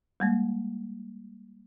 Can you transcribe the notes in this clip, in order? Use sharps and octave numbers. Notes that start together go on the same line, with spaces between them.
G3 G#3 A#3